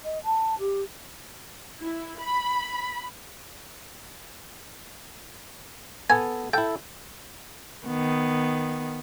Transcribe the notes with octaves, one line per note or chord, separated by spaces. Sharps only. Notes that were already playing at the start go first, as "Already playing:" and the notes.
D#5
A5
G4
E4
B5
B3 A4 G#5
E4 A4 G5
D#3 B3